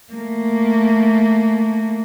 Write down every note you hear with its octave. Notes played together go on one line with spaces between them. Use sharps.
A3 A#3